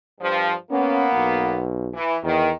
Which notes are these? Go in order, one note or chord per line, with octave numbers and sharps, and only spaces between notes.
G2 F3
A#3 B3 C#4
B1
E3
E2 D#3